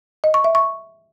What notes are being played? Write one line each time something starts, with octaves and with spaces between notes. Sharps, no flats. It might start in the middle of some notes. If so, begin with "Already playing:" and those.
D#5
C#6
E5
C#6